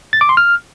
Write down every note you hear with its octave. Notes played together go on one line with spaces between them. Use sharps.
A6
D6
C6
F6